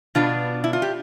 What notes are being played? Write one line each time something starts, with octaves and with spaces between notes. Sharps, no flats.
B2 B3 D4 F4
E4
F4
G4